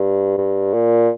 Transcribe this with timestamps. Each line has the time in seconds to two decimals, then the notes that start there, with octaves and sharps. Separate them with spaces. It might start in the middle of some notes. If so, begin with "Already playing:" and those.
Already playing: G2
0.38 G2
0.74 A#2